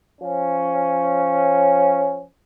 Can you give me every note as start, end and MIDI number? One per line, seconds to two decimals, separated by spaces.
0.21 2.23 53
0.21 2.23 61